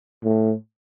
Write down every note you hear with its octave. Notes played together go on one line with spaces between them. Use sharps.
A2